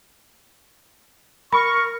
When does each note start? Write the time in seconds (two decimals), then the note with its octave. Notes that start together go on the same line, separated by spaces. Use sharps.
1.53 A#4 B5 C#6